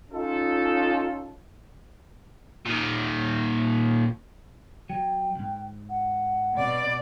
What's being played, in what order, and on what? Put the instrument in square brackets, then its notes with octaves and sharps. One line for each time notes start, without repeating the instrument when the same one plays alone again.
[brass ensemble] C#4 D#4 F4 A4
[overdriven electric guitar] A#2 D#3
[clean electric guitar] F#3 [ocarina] G5
[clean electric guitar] C2 G#2
[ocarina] F#5
[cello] B2 D5